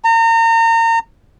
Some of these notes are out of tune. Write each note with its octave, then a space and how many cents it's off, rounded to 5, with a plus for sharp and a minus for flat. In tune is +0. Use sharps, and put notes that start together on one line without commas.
A#5 -35